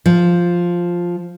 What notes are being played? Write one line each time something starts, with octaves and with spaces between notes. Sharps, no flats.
F3